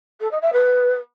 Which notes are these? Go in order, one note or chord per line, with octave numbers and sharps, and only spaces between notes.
A4
D#5
E5
B4